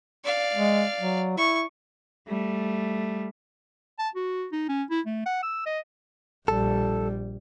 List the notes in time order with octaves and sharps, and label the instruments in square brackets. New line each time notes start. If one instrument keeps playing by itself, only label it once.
[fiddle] D5 F5
[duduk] G#3
F#3
[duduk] E4 [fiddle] C#6
[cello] G3 A3
[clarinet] A5
F#4
D#4
C#4
E4
A3
F#5
E6
D#5
[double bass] A#1 G3 [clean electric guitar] A4